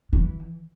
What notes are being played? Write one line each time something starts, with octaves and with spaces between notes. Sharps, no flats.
E3